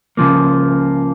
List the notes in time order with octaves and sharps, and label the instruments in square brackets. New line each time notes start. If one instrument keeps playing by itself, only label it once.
[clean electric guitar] C#2 C#3 F3 A#3